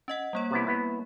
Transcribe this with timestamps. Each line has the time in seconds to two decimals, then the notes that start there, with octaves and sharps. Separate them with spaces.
0.08 C#4 D#5 F#5
0.33 G3 A#3 C#5
0.51 C3 B3 E4
0.67 B3 E4